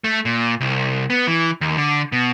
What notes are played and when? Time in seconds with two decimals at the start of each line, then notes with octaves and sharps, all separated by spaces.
0.04 A3
0.25 A#2
0.60 C2
1.10 B3
1.27 E3
1.61 D#2
1.77 D3
2.12 B2